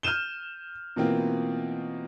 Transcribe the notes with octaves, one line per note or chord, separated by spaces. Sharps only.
F6 G6 D#7 E7 G7
B2 E3 A#3 C4 F4